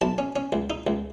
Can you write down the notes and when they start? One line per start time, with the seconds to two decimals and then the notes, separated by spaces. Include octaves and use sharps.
0.01 B1 A5
0.18 C#4
0.36 C#4
0.52 C#2
0.70 D#4
0.87 C#2